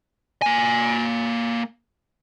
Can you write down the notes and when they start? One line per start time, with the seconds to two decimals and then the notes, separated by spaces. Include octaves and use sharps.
0.42 A#3 G#5